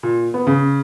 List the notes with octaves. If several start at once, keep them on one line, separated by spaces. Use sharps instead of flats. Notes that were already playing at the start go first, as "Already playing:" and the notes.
A#2
B3
C#3